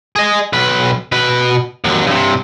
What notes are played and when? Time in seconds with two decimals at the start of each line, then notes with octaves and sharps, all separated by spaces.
0.16 G#4 D#5
0.53 B1 B4
1.12 B2 B4
1.84 D#2 F#3
2.07 G2 C3